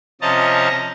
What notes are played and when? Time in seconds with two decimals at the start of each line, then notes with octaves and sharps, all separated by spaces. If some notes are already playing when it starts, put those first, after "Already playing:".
0.21 C3 F3 C#4 D#5 A5 A#5